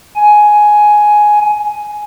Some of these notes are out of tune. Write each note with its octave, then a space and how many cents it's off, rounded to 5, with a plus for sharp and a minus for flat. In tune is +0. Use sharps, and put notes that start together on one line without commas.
G#5 +10